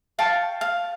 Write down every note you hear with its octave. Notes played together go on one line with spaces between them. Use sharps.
F5 G5 A5 C#6
F5